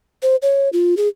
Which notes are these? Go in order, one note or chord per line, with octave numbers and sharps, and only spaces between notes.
C5
C#5
F4
G#4